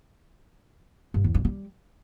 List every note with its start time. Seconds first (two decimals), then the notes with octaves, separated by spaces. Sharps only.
1.14 G2
1.24 E2
1.34 G2
1.45 G3